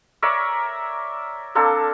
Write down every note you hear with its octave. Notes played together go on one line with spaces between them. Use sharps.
A#4 C#5 D5 E5
A#3 C4 D4 A4